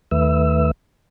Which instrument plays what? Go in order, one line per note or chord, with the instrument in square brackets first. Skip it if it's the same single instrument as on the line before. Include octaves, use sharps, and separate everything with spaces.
[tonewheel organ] D#2 D#3 A3 B4 E5 E6